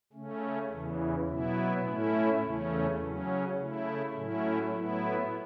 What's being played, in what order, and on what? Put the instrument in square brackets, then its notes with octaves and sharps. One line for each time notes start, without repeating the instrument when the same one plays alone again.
[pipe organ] C#3 A3 C#4
E2 C#3 E3
B2 F#3 B3 E4
A2 A3 C#4 E4
E2 C#3 A3 C#4
C#3 F#3 C#4
C#3 A3 E4
A2 F#3 A3 C#4 E4
A2 F#3 B3 E4